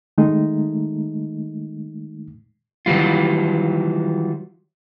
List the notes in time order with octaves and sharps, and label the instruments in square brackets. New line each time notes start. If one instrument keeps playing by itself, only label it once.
[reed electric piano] D#3 G#3 A3 D#4
[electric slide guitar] D#3 E3 F#3 G3 F4